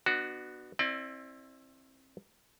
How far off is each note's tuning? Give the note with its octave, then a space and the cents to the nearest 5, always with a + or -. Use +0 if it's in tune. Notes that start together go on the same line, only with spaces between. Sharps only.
B3 +0 D4 +35 F#4 +0
C4 +30 E4 +0 D5 +30